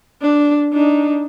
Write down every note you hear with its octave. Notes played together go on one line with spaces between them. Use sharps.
D4
D4 D#4